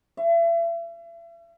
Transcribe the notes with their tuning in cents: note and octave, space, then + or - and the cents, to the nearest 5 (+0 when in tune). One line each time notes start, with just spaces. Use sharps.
E5 +40